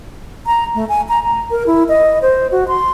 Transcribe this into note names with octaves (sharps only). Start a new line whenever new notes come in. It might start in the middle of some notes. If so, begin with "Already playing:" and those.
A#5
A3
G#5
A#5
A#5
A#4
E4
D#5
C5
F#4
C6